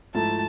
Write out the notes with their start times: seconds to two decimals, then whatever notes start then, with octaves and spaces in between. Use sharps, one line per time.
0.14 G#2 F3 A3 E4 A5